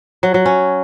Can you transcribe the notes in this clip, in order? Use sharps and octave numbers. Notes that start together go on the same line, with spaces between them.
F#3
F#3
C#4